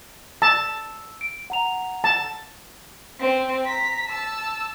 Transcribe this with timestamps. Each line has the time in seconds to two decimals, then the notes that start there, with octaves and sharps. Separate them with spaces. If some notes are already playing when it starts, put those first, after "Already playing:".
0.42 A5 E6
1.21 D7
1.50 F#5 A#5 F7
2.04 A5
3.20 C4
3.65 A#5 B6
4.08 A5 E6